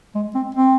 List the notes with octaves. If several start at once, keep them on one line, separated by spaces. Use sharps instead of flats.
G#3
C4
C4